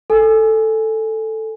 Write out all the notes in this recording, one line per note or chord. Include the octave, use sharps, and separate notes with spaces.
A4 G#5